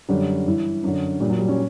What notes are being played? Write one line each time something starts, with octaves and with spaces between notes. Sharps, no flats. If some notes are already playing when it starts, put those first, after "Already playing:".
F#2 D3 G3
G2 E3
F#2 D3
A#2 G3
F#3
G3
C#4